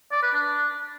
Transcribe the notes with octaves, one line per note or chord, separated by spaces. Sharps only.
D5
B4
D4